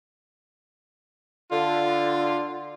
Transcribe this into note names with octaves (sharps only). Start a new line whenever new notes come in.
D3 F4